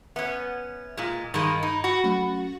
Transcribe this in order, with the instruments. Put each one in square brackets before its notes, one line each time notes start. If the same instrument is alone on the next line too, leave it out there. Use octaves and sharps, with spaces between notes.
[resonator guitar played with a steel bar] B3 C#4 [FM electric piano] E5
[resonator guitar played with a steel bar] A#2 G#3
[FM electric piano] G2 [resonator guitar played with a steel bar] D#3 G#3 A#3 [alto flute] B5
[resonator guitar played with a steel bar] D#4
F#4
[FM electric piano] F#3 A3 C#4